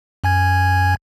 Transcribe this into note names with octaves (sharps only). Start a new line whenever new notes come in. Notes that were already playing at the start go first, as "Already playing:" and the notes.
F#2 G#5 G#6